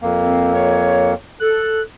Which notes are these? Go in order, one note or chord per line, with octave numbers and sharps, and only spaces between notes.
F2 A#3
C4
C#5
A4 F#6